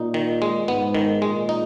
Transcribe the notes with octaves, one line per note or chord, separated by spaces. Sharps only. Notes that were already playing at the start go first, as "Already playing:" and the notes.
Already playing: A#2 D#4
D#3
G#3
G#2 B3
D#3
A#2 G#3
D#4